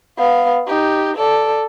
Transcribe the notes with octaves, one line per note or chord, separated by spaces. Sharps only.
B3 F5
D#4 G4
A4 D5